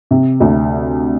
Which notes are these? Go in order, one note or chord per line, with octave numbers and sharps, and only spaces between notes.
C3
D2